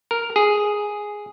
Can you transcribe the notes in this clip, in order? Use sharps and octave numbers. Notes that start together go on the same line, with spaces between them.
A#4
G#4